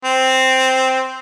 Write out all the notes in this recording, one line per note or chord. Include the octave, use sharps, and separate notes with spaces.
C4